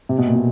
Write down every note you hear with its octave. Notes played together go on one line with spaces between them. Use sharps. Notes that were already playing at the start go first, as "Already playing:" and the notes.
C3
B2
A#2
B2